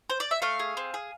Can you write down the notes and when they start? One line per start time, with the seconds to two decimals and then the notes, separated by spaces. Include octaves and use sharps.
0.10 C5
0.20 D5
0.31 E5
0.42 A3 F5
0.59 G#4
0.77 C4
0.94 G#4